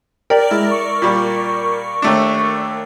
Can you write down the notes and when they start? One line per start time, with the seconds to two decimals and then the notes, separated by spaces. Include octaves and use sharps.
0.30 G4 A#4 D5
0.51 G#3 E4
0.71 C#6
1.02 A#2 G3
2.02 D#2 A3 D4